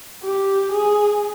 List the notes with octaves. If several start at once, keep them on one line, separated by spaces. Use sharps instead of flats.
G4
G#4